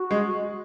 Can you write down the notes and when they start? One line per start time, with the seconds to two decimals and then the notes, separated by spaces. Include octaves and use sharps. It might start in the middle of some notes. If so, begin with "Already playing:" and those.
Already playing: F#4
0.11 G#3